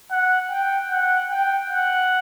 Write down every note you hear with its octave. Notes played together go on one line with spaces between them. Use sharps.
F#5
G5
F#5
G5
F#5